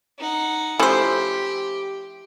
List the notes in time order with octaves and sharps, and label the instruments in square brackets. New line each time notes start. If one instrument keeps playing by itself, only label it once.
[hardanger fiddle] D#4 F#5
[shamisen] F3 A3 C#4 [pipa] E4 C5 [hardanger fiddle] G4